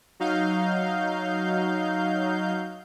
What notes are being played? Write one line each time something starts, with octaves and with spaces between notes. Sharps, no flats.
F#3 D#4 F5 G6